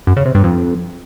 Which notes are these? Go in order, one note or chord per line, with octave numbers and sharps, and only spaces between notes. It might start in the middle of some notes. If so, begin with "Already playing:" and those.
F#2
C#3
C3
G2
F2